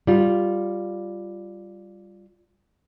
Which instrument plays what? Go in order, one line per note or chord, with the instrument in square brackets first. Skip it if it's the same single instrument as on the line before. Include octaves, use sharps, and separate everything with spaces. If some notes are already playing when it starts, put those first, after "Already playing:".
[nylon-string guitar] G3 F4